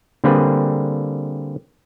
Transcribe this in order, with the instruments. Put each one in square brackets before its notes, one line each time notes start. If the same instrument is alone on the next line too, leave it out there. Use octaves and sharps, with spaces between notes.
[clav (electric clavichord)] D3 G3 A#3 C4 G#4 B4